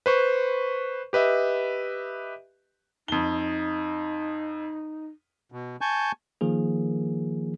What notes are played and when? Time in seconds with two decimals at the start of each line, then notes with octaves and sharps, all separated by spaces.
0.06 B4 C5 C#6
1.13 G4 B4 D#5 E5
3.08 F2 D#4 G7
5.52 B2
5.81 G#5 A5 C#6 G6
6.41 D#3 F3 A#3 G#4